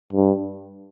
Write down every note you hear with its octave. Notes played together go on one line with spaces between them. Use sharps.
G2